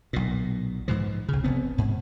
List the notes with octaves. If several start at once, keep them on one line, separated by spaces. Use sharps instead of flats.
B1 A#2
G#2 E3 F3
C2 C#3
F1 B3 C4
G#2